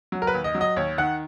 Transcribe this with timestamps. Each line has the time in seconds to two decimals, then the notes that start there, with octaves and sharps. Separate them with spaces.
0.12 F#3
0.22 A#4
0.27 B4
0.34 D#2
0.44 D#5
0.55 F#3
0.61 D#5
0.76 D#2 C#5
0.98 D#3 F#5